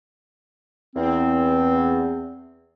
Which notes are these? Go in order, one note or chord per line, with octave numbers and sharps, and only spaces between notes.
E2 C4